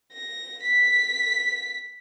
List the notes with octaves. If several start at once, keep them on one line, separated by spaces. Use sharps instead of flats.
A#6
B6